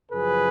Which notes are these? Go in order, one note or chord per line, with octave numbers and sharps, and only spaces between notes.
F#2 C#3 F3 G#4 B4